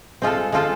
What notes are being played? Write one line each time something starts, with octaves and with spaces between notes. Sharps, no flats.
G#3 C4 F4 A4
G#3 C4 F4 A4